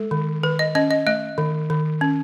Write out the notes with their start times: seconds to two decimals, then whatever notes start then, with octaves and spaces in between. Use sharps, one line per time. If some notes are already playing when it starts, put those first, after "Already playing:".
Already playing: G#3 A4
0.11 D#3
0.43 D#3 B4
0.59 D#5
0.75 C#4 D#5
0.91 D#5
1.07 A3 D#5
1.38 D#3
1.70 D#3
2.01 C#4